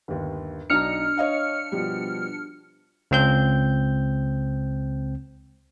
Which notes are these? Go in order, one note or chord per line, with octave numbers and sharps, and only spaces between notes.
G1 D#2
B1 D4 D#4 A#5 F6 C#7
C#5 D#5 F5
B2 F3 G3
C#2 C4 G6